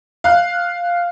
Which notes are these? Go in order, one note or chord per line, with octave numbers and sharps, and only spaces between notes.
F5 F#6